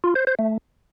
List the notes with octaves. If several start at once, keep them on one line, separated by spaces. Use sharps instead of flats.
F4
C5
C5
A3